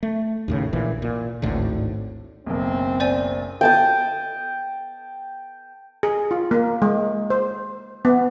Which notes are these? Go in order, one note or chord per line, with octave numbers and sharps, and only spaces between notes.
A3
D#2 A2 C#3
A#1 A#2 E3
A#2
G#1 D2 A2 D3
F#1 B1 C4
C5 D5 G#5
G5 A5 D#6
G#4
F4
A#3
G#3
C5
B3